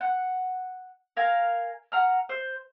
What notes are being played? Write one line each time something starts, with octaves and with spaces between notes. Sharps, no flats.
F#5
A#4 F5 G#5
F#5 A#5 F6
C5